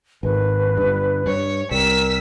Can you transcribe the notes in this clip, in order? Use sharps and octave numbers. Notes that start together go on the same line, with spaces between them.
G#1 D#3 B4
G1 G2
G2 C#5
C2 G3 A#4 E6 B6